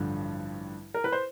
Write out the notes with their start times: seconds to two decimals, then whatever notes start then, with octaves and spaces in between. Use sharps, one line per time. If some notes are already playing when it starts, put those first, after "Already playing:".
Already playing: A1 G2 D3 F3
0.94 A#4
1.04 B4
1.12 C5